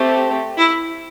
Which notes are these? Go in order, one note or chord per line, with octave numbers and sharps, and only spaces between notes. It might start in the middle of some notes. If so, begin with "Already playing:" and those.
Already playing: A3 C4 G4
E4